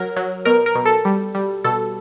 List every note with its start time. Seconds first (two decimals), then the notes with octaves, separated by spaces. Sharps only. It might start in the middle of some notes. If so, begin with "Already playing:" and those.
Already playing: F#3 A#4
0.16 F#3
0.45 B2 A#4
0.66 A#4
0.75 B2
0.85 A4
1.05 G3
1.35 G3
1.64 B2 A4